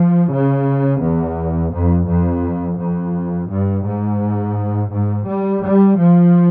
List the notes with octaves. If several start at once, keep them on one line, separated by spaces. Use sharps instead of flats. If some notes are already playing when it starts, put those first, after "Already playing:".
Already playing: F3
C#3
E2
F2
F2
F2
G2
G#2
G#2
G3
G3
F3